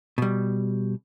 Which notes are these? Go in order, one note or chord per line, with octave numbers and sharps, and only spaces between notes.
B2 G3